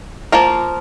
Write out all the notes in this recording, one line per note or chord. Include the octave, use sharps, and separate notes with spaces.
F3 A#3 F4 A#4